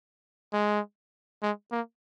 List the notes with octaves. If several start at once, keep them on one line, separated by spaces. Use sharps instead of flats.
G#3
G#3
A#3